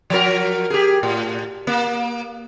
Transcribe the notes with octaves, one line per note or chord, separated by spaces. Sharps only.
F3 F#3 A#4
G4 G#4
A2
A#3